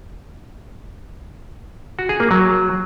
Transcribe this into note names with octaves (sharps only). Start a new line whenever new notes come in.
F#4
G#4
A#3
F#3